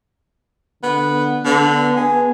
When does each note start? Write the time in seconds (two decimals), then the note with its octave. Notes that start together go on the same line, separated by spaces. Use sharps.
0.83 D3 B3
1.45 D3 B3
1.97 B3 G#4